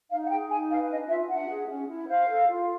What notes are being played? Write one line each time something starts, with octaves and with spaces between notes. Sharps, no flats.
D#4 F5
F#5
G#4 G5
D#4 G#5
B4 F5
D4 D#5
F4 E5
D4 F#5
G#4
C#4
E4
C5 F5
A4
F4